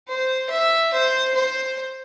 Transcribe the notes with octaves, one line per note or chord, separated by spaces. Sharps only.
C5
E5
C5
C5